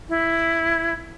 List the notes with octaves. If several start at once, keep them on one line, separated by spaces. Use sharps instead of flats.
E4